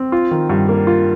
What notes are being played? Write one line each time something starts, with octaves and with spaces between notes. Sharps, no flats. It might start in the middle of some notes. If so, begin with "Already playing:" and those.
Already playing: C4
F4
D#3
G2
A#3
F4